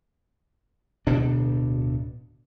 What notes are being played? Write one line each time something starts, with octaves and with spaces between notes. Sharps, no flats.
D1 B2 D4